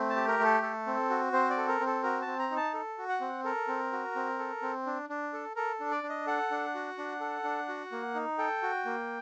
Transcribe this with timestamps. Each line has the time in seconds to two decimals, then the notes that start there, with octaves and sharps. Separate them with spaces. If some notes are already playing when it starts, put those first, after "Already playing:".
Already playing: A3 C4
0.10 A5
0.16 G4
0.27 A#4
0.39 A3 A4
0.63 A4
0.87 C4
1.10 F#4
1.33 C4 C5
1.50 D5
1.57 A4
1.68 A#4
1.80 C4
1.86 A4
2.03 F#4 A#4
2.22 C4 A5
2.39 A#5
2.51 D#4
2.57 A5
2.74 A4
2.98 F#4
3.09 F#5
3.21 C4
3.44 A4 A#4
3.68 C4
3.92 F#4
4.15 C4
4.39 A4
4.62 C4
4.86 D4
5.09 D4
5.33 A4
5.56 A4 A#4
5.80 D4
5.91 D5
6.03 D4
6.09 D#5
6.26 A4 F#5
6.51 D4
6.75 F#4
6.98 D4
7.20 A4
7.44 D4
7.69 F#4
7.92 A#3
8.15 D#4
8.38 A4 G5
8.62 F#4
8.85 A#3